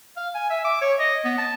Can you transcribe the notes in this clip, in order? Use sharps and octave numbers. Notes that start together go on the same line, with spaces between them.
F5
G#5
E5
D6
C#5
D#5
B3
A5